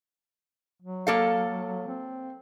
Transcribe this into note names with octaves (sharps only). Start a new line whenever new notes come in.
F#3
A#3 A4 F5
C4